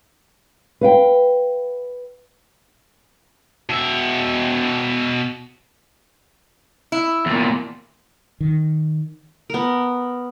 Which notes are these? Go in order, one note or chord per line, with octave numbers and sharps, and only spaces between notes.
B4 F5 G5
B2 E5
E4
E2 A#2
D#3
B3 A#4